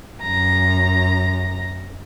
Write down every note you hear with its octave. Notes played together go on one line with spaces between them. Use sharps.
F#2 A#5